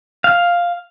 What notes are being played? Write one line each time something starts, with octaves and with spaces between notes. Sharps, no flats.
F5